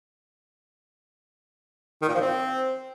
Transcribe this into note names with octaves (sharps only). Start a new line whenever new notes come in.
D#3
A#2
F3
C4